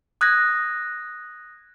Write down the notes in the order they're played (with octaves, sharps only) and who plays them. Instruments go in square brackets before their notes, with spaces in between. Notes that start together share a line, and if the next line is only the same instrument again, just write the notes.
[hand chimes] D#6 F#6 G#6 A#6